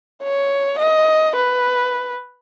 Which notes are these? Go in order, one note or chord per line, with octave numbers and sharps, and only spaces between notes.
C#5
D#5
B4